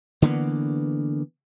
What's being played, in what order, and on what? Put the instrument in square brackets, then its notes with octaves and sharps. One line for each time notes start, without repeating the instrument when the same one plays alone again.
[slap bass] D3 E3 A#3 B3